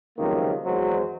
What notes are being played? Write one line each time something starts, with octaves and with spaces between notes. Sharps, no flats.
C#2 C3 D#3 F3 F#3 A#3
G#1 E2 F#3 G#3 C5